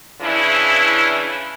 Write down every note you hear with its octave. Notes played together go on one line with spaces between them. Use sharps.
C#3 E3 D4 E4